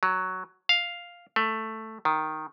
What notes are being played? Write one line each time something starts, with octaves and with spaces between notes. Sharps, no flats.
F#3
F5
A3
D#3